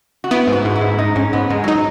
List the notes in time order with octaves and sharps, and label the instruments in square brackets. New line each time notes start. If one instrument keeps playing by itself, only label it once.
[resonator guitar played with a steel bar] F#4
[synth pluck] B3 [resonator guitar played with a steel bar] E4
[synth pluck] G#2
[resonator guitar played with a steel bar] F#4
[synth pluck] G#2
[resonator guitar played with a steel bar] E4
[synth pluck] G#2
[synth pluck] G#2 [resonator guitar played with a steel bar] D#4
[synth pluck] G#2 [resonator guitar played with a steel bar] C#4
[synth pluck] G#2 [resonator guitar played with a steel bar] B3
[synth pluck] G#2 [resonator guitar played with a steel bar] G#3
[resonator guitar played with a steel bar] F#3 [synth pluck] D#4